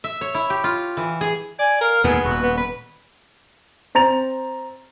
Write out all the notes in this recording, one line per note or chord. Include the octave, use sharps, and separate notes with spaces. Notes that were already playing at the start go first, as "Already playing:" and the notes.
E5
C#5
E4
G4
F4
E3
G#4
D5 G#5
A#4 F5
D#2 G#2 B2 B3 G#4
D#1 F#4
B3
B4
C4 A#5 A6 F7